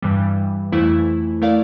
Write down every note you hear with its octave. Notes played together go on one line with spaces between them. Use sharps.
G2 E3 G3
F2 E3 A3 E4
A3 E4 A#4 D5 F5